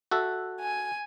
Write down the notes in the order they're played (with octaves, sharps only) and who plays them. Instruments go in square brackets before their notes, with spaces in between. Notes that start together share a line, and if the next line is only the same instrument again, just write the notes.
[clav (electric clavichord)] F#4 A4 E5
[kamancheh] G#5